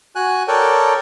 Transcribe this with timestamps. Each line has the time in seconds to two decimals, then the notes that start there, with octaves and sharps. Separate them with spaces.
0.15 F#4 G#5 F#6
0.48 A4 A#4 C#5 D5 G5